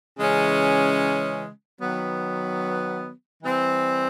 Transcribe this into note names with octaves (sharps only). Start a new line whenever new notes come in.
C#3 E3 G#3 C#4
D#3 F#3 B3
E3 G3 C4